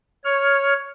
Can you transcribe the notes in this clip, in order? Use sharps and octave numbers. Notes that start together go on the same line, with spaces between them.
C#5 F6